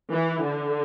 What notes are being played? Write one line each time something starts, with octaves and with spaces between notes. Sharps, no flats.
E3
D3